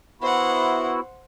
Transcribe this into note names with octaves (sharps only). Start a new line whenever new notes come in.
B3 E4 F#4 C5 F#5